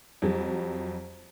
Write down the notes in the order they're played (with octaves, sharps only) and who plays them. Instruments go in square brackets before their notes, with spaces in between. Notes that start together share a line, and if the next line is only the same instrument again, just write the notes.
[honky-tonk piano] F2 F#3 G3